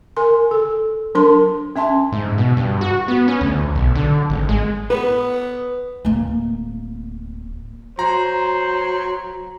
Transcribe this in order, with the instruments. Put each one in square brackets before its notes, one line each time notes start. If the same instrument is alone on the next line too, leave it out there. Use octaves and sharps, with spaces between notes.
[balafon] A#4 G#5 C6
A4
F#3 D4 A#4 C6
C#4 E5 A5 C6
[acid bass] G#2
B2
G2
F#4
B3
C#4
D2
B1
D3
G#1
G#3
[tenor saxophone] B3 [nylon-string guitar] B4
[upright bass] D1 A#3
[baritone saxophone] F#3 [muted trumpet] C5 [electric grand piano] A#5